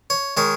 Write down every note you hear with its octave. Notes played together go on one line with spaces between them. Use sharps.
C#5
D#3 G#3 C#5